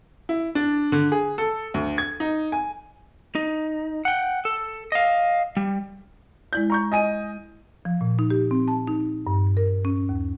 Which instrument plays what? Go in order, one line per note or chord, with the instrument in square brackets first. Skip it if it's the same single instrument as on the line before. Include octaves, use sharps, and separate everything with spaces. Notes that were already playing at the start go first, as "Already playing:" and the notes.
[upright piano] E4
D4
D3
G#4
A4
D2
G#6
D#4
G#5
[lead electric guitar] D#4
F#5 G5
A4
D#5 F5
G3
[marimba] G#3 E4 D5 [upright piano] G6
[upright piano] A#5 C#6 G6
D#5 G#5 D#7
[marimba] F3
A#2
D#4
G4
C4
A5
D#4
G2
A#4
C#4
D#2